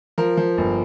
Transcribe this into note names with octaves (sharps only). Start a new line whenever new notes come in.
F3 A#4
F3
G1